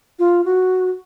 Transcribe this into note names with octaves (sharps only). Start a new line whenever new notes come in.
F4
F#4